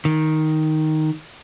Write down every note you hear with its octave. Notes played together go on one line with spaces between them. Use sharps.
D#3